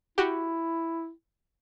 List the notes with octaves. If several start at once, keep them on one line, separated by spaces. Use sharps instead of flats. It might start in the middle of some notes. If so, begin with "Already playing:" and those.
E4 F#4 G4